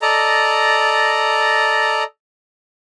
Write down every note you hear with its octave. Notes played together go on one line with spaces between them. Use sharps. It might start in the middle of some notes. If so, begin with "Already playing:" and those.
A4 D5 D#5 A#5